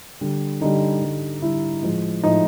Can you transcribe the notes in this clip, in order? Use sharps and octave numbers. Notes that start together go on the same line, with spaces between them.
D3 G3
D3 G3 D#4
D3 G3
D3 G3 E4
A2 F3 G#3
A2 F3 G#3 D#4